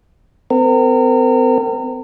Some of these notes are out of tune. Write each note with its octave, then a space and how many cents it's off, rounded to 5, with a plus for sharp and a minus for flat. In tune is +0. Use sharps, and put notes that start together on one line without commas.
C4 -40 A#4 -35